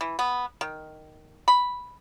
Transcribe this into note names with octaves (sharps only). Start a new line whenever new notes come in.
E3
B3
D#3
B5